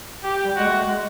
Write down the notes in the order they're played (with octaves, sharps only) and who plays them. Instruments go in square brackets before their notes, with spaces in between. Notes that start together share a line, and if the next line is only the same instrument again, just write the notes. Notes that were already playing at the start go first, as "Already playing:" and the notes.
[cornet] G4
[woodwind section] G3
[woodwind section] G#3 [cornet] F#4
[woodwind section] A3
G#3